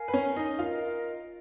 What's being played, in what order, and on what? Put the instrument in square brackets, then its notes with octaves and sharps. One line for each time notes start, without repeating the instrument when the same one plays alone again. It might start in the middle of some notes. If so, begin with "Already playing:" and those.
Already playing: [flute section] A#4 F5 G#5
[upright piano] B4
C#4 C#5
D#4 D#5
[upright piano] F4 F5 [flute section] A#4 D#5